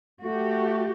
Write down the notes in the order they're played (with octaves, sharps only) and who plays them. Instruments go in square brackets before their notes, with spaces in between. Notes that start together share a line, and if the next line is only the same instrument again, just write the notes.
[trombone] A3 [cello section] F#4 G4